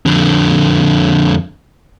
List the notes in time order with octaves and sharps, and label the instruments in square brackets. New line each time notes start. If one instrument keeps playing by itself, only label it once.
[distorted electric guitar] F2 D3